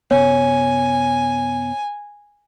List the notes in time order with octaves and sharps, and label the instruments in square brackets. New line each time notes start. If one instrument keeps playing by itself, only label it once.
[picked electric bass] F#2 C3 B3 [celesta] C#5 [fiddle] G#5